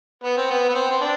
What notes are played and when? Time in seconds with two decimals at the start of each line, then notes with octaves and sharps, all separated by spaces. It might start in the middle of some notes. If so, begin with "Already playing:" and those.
0.24 B3
0.37 C4
0.50 B3
0.69 B3
0.75 C4
0.91 C4
1.01 D4